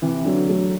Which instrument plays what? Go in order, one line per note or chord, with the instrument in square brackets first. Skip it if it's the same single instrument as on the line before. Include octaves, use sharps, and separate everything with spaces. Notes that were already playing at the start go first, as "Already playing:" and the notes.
[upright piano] C3 E3
D3 F#3
F#3 A3